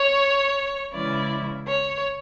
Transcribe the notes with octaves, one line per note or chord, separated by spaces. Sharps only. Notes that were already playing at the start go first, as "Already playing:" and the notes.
Already playing: C#5
C#3 E3 G#3 C#4 E4 D5
C#5